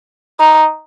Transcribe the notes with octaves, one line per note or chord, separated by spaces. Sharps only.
D#4